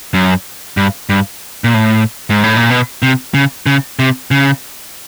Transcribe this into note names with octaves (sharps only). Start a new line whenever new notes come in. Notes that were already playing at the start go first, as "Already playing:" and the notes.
F#2
G2
G2
A#2
A2
G#2
A2
A#2
B2
C3
C#3
C#3
C3
C#3